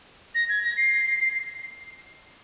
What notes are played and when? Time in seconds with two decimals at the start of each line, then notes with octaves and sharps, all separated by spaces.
0.35 A#6
0.49 G#6
0.63 A#6
0.77 C7